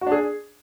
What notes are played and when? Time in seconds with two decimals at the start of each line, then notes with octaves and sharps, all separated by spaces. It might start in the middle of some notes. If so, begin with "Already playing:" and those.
0.01 F#4
0.07 D4
0.12 G#4